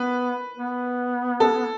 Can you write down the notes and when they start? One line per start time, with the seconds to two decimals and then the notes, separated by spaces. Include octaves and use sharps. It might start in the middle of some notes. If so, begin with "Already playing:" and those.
Already playing: B3 B4
0.57 B3
1.40 A4